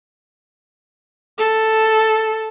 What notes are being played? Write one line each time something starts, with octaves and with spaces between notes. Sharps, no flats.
A4